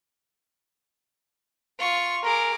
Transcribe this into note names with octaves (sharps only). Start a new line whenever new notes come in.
F4 C#6
G#4 A#4 D6